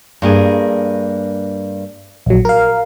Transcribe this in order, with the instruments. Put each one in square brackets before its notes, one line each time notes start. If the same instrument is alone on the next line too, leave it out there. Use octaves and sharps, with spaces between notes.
[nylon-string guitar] G2 A#3 G#4
[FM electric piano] A#1 F#3
A#4 F5